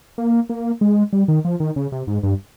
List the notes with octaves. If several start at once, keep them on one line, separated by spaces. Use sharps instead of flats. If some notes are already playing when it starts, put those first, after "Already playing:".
A#3
A#3
G#3
G3
D#3
F3
D#3
C#3
C3
G#2
G2